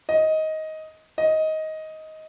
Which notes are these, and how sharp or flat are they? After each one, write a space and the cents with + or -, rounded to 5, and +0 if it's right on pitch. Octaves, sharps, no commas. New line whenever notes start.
D#5 +15
D#5 +15